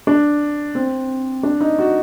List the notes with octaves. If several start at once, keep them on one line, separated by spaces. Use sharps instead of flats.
D4
C4
D4
D#4
F#4